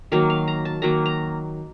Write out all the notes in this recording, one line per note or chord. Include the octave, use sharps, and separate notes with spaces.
D#3 F#3 A#3 F5
F5
A#5
A5
D#3 F#3 A#3 A#5
A#5